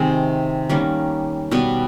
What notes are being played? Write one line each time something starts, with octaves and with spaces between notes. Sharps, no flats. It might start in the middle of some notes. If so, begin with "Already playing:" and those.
Already playing: C3 D#3 G#3 C4
D#3 G3 A#3 C#4
B2 G3 B3